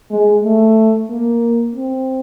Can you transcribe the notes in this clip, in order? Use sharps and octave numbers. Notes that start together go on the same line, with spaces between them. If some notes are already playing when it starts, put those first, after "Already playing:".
G#3
A3
A#3
C4